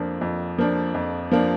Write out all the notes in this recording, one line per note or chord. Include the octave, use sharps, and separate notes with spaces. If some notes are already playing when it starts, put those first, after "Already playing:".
Already playing: F2 F3 A#3 D4
F2
F3 A#3 D4
F2
F3 A#3 D4